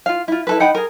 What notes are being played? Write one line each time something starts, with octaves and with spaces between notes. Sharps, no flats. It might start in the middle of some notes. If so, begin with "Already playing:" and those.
F4 F5
E4 F4
E4 A4 B4
D#4 F#5 G5 B5
G#4 A#4